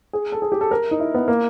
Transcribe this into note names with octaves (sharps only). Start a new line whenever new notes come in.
G#4
A4
G#4
G4
A4
A#4
D#4
E4
B3
A#3